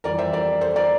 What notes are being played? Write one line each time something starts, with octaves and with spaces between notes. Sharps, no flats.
F2 E3 G3 A#4 D5
C5 E5
A#4 D5
A4 C5
A#4 D5